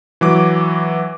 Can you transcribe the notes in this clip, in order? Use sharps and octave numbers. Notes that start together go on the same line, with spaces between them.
E3 F#3 D6